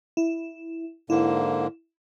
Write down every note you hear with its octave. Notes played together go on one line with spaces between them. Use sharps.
E4
G#2 D3 A#3 E4